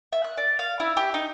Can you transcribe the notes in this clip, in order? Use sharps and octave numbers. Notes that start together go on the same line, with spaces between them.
E5
F#6
D5
F5
E4
G4
D#4